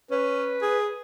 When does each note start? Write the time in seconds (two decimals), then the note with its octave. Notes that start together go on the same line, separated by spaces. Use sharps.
0.11 C#4 B4
0.62 G#4